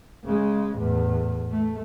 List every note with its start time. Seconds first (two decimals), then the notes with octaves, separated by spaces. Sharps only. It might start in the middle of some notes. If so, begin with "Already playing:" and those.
0.24 C#3 G#3
0.76 E2 A2
1.51 A3